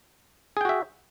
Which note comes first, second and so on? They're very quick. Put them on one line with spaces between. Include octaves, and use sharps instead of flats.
G#4 G5 F#4 E5